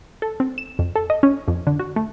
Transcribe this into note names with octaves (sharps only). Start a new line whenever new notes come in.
A4
C4
E7
F2
A4
D#5
C#4
F2
D3
F#4
A3